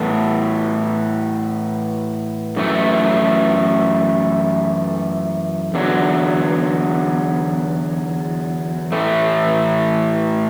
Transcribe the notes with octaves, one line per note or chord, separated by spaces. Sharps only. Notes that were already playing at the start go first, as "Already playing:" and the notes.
Already playing: A2 E3 B3
F#2 E3 A3
E2 D3 F#3
A2 E3 A3